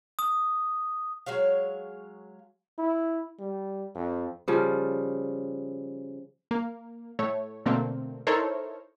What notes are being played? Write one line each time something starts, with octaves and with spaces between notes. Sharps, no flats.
D#6
F#3 G#3 C#5 F5
E4
G3
F2
C#3 F3 G3
A#3
A2 A3 C#5
B2 D3 A3 A#3 C4
D#4 E4 A4 A#4 C5 C#5